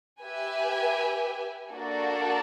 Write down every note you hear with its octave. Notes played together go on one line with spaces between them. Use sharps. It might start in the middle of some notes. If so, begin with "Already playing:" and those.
G4 B4 E5 G#5
A#3 D4 F#4 A4 D5